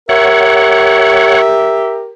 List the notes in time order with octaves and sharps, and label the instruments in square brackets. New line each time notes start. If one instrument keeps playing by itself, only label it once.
[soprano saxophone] G4 [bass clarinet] A#4 [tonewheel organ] C#5 F#5 [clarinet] E5